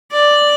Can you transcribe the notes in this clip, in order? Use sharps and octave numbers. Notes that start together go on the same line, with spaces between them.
D5